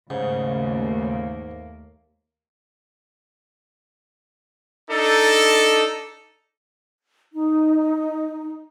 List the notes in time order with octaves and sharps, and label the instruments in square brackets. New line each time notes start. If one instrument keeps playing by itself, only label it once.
[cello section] D#2 A3 A#3 [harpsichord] G#2 [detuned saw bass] C#3
[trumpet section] D4 D#4 A4
[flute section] D#4